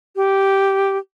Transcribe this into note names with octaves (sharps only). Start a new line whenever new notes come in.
G4